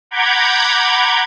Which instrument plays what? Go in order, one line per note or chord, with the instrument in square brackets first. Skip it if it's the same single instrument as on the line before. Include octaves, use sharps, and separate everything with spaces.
[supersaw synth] F#5 A#5 B5 D6 G6 G#6